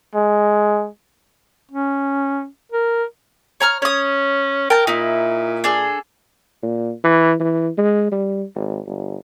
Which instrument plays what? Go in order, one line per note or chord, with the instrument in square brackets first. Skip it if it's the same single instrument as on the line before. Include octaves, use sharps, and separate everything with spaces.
[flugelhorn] G#3
[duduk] C#4
A#4
[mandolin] C#5 A#5 F6
[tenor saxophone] C#4 [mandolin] C#5 D#6
[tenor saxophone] A#4 [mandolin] G5 A5
[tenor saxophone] A#2 [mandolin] D#4 E4
[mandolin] D4 G#4 A4
[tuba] A#2
E3
E3
G#3
G3
G#1
G1